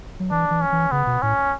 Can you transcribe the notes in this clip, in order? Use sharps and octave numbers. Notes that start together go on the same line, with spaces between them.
F#3
E3 D4
E3
C#4
E3
C#3 B3
B2
A2 C#4